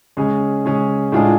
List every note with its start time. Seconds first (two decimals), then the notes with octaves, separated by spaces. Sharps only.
0.17 C#3 G#3 C#4 G#4
0.65 C#3 G#3 C#4 G#4
1.12 A2 G#3 D4 F4 G#4